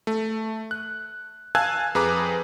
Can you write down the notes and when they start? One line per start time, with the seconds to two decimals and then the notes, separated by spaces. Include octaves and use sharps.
0.07 A3
0.71 F#6
1.55 F5 G#5 A5 E6 F#6 G#6
1.95 F2 G#4 B4 A#5 D6